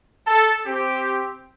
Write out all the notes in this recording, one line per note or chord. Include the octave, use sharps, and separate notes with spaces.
A4
C4 G4